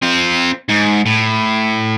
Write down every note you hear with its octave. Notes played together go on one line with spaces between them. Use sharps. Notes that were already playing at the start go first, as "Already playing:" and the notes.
C4 F4
G#2
A2